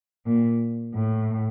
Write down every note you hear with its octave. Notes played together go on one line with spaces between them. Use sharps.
A#2
A2